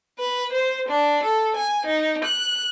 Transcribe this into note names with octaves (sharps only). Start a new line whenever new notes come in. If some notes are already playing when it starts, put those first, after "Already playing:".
B4
C5
D4
A4
G#5
D#4
F#6